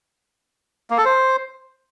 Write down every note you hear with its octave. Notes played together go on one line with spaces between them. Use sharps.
A#3
A4
C5